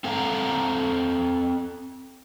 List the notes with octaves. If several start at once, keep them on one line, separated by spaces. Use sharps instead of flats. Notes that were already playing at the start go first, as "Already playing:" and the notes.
C4 A4 F5 F#5 A#5